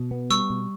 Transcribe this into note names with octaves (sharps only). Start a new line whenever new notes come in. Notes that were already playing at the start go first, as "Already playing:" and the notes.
Already playing: B2
B3
G3 C#6 E6
B2